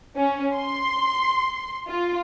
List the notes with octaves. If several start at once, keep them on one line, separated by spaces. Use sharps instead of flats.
C#4
C6
F4